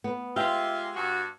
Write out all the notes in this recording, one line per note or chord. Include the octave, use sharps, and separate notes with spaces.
B3
G#3 F4 G4 E5
G2 F#4